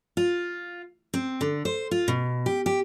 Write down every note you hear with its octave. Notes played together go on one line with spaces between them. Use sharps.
F4
C4
D3
C5
F4
B2
G4
G4